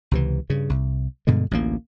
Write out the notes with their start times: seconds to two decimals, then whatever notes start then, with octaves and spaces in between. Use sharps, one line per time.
0.11 C#2 C3 E3
0.50 G2 C#3
0.70 C2
1.27 G2 B2 D3 G#3
1.51 A1 D2 G#3 A#3